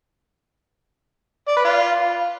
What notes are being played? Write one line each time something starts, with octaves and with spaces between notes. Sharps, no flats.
D5
B4
F4